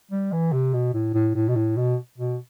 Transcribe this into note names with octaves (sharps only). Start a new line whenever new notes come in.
G3
E3
C3
B2
A2
A2
A2
B2
A2
B2
B2